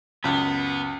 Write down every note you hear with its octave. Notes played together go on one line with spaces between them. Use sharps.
C#2 F#2 B3